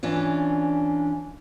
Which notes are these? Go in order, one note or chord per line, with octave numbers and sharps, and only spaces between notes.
E3 C#4 D4 F4